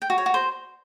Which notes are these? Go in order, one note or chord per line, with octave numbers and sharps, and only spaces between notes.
G5
F#4
C#5
F#4
C5